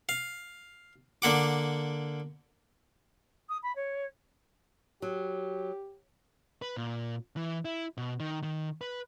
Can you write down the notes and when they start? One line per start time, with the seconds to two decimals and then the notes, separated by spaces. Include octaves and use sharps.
0.09 F5
1.22 D3 A#3 F#5 D6
3.49 D#6
3.63 B5
3.75 C#5
5.02 F#3 G4
6.62 B4
6.77 A#2
7.36 E3
7.65 E4
7.97 B2
8.20 D#3
8.43 D#3
8.81 B4